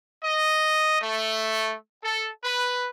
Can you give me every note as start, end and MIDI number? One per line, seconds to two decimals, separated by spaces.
0.24 0.98 75
1.02 1.74 57
2.04 2.30 69
2.44 2.89 71